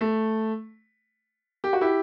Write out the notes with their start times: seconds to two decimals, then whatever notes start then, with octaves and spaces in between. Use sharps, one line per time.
0.01 A3
1.64 G4
1.73 F#4
1.81 E4 G4